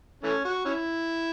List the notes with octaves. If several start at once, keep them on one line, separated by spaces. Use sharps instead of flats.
E3 A3 C#4
F#4
C#4 E4